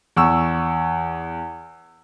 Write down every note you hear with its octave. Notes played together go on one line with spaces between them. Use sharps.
E2 C#6 E6